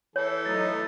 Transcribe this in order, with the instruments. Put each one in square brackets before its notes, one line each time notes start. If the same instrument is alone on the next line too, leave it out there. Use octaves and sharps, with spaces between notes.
[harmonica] E3 A4 [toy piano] C#5
[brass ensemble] F#3 A3 D#4 [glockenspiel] A6